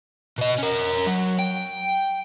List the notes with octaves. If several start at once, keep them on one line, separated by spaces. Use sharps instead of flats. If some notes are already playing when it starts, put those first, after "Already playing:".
B2 D#5
C#4 A#4
F#3
G5